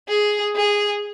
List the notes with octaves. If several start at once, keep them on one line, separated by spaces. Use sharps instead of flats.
G#4
G#4